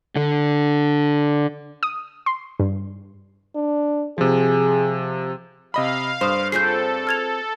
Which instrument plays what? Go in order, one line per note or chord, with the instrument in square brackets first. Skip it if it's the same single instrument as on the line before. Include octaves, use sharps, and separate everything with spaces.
[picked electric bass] D3
[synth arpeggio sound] D#6
C6
G2
[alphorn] D4
[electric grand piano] C3 F3 [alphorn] G#4
[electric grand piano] C3 D#5 B5 [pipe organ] F5
[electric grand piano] G2 [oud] C5 [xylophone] C6 D#6
[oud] C4 F4 G#4 [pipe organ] A4 [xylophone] G6 B6 C7
[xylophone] F6 G#6 F7